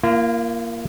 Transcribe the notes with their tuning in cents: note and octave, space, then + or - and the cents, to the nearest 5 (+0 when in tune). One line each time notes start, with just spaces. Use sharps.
A#3 +0 F4 -45